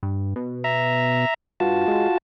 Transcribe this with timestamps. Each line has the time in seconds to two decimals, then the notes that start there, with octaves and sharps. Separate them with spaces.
0.03 G2
0.36 B2
0.64 E5 A#5
1.60 G2 F4 F#4 A5
1.88 G#3